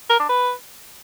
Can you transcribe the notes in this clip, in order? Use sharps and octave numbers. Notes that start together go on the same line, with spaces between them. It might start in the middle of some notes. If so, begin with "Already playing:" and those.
A#4
D4
B4